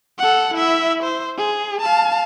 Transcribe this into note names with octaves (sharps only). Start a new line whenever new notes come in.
A4 F#5
E4 E5
C5
G#4
F5 A5